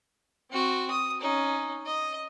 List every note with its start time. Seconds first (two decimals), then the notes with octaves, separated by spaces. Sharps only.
0.51 C4 F#4
0.91 D#6
1.21 C#4 D#4
1.86 D#5